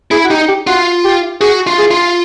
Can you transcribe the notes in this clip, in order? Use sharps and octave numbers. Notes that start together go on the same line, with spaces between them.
E4 G#4
F#4
D#4 G4
G4
F4 F#4
G4
F#4 G#4
F4
G#4
F4